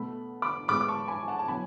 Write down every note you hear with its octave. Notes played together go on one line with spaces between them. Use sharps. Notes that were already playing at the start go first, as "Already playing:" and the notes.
Already playing: B2 A3 B5
B5 D6
A2 G#3 B3 B5 D6
D6
A5 C#6
G#5 B5
F#5 A5
A5
B2 F#3 G#5 B5